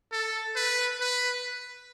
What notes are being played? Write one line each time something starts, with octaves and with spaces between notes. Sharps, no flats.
A4
B4
B4